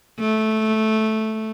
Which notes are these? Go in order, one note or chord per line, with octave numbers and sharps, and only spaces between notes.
A3